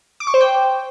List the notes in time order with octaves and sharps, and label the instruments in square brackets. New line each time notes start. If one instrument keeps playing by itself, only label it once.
[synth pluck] D6
C#6
C5
G5